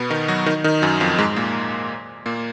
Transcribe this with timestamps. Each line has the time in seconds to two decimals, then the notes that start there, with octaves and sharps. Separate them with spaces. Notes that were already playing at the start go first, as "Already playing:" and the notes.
Already playing: B2 B3
0.10 D#3 D#4
0.28 F#3 F#4
0.46 D#3 D#4
0.64 D#3 D#4
0.82 F#2 F#3
1.00 F2 F3
1.18 G#2 G#3
1.36 A#2 A#3
2.26 A#2 A#3